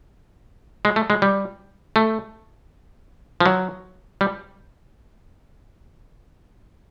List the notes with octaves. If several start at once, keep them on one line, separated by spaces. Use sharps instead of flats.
G#3
A3
G#3
G3
A3
F3
F#3
G3